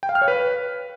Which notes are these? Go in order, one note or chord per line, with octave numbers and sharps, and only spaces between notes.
G5
F5
F6
C#5
B4